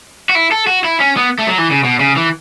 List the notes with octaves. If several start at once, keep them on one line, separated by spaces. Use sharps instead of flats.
F#4
E4
A4
F#4
E4
C#4
B3
A3
F#3
E3
C#3
B2
C#3
E3